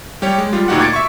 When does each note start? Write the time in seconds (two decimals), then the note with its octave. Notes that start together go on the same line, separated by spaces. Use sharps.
0.22 G3 G4 C#5
0.38 G#3
0.53 G3 F4
0.68 D2 A#2 D#4 F#4 G4 F#5
0.80 D6 G#6 A6 C#7 D7
0.93 E5 C#6